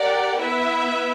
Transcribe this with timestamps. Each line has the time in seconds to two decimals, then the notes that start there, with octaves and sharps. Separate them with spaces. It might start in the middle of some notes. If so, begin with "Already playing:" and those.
Already playing: G4 A#4 D5 F#5
0.38 B3 E4 B4 E5